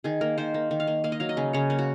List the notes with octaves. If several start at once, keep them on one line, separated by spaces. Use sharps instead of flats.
D#3 G#4
A#3 A#4
D#3 C5
A#3
D#3
F5
A#3
A#3 F5
D#5
F#3 F5
D#5
C#3
C#3 C#5
A#3
F#4